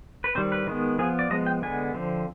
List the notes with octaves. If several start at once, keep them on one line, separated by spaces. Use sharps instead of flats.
B4
D#3 G3 C4 C5
B4
D#3 G#3 B3
F3 B3 G#4
D5
F3 G#3 B3 D#5
G5
D3 G#3 B3 G#5
D3 F3 C4